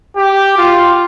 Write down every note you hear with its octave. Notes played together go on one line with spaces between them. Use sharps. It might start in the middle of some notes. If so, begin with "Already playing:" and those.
G4
F4